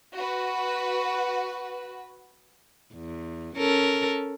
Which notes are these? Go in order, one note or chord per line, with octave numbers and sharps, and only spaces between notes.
F#4 B4
E2
C#4 A4 A#4